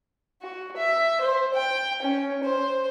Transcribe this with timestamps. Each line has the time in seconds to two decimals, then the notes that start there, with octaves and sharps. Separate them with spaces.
0.42 F#4
0.76 E5
1.21 C5
1.54 G5
2.02 C#4
2.43 C5